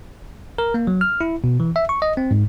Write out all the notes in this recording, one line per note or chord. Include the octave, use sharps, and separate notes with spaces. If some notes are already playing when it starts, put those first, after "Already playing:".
A#4
A#3
F#3
F6
E4
B2
E3
E5
C#6
D#5
C4
G#2